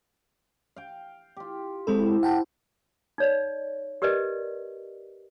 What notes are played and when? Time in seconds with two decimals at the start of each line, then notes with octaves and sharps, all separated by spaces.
0.76 F5 G5
1.37 F4 G4
1.87 G#3 C4 E4 A4 C5
2.23 F#5 G5 A5
3.18 D#4 C#5 D5
4.02 G4 A#4 B4 D5 D#5